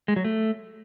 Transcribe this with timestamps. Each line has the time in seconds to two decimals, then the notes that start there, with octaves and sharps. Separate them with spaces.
0.08 G#3
0.16 F#3
0.24 A3